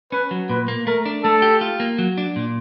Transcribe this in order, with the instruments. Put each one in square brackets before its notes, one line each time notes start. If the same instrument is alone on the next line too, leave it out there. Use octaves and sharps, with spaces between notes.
[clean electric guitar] C#4 [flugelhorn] B4
[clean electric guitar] F#3
[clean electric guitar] A#2 [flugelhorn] B4
[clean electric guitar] A#3
[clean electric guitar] A3 [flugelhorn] A#4
[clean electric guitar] D4
[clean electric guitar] A3 [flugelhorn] A4
[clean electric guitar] G4
F4
A#3
F#3
D4
A#2